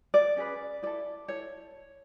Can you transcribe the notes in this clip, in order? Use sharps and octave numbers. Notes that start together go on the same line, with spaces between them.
D5
C#4 G#4 B4
E4 A4 D5
E4 A4 C#5